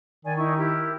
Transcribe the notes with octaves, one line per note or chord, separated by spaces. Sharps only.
D#3 D5 G#5
D#4 E4 C#6
E4 G4 A#4